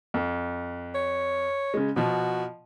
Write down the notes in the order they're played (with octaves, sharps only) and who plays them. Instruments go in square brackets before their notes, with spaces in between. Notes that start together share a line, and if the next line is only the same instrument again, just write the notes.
[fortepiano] F2
[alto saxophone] C#5
[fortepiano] C#3 G#3
[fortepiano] B2 F3 [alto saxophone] F#4